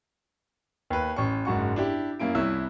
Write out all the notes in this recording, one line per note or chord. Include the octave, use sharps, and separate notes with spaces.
D#2 B4
A1 C#6
F#1 G#2 F#4 C#6
D4 E4 G4
F#2 A#3 E4 D7
C2 E4 C#5 E6